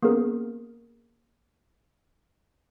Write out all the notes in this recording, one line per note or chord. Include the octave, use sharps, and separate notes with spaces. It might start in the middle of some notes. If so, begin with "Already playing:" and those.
A#3 B3 C#4 G#4 A#4